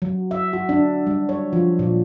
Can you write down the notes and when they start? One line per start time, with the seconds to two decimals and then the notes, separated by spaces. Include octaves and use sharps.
0.02 F#3
0.31 E5
0.53 F#4
0.69 D4
1.07 G3
1.29 C#5
1.53 F3
1.79 A#2